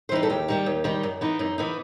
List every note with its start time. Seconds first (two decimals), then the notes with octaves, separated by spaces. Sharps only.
0.09 C5
0.12 E3 G3 D#4 B4
0.23 A4
0.29 D#2 G4
0.48 D#3 G3 D#4
0.66 D#2
0.84 D#3 G3 D#4
1.03 F#2
1.21 E3 B3 D#4
1.39 F#2 D#4
1.58 E3 B3 D#4